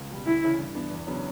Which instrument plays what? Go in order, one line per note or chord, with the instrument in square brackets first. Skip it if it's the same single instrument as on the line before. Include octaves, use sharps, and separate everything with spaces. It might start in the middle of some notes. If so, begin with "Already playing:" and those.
Already playing: [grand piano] C#2
B2 G3
[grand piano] D2 [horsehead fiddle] E4
[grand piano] C#3 E3
G2
E3 B3 D4
E2
C#3 F#3 B3 D4